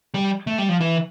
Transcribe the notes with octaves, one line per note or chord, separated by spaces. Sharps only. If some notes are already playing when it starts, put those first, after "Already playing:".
G3
A3
G3
F3
E3